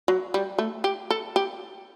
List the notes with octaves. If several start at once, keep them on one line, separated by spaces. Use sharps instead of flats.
F#3
G3
A3
G4
A4
G4